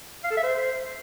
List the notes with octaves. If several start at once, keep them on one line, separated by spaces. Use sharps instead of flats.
F5
A4
E5
C5